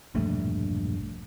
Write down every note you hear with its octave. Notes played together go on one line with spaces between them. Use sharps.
E1 A#1 G2 A3